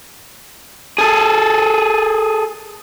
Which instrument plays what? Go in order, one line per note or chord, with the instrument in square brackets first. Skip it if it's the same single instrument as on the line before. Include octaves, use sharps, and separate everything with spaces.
[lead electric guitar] G#4 A4